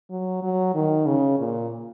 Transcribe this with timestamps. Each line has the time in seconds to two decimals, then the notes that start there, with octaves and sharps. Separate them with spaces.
0.10 F#3
0.43 F#3
0.74 D#3
1.06 C#3
1.39 A#2